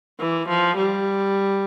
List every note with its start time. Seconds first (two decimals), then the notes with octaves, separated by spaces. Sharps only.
0.20 E3
0.49 F3
0.78 G3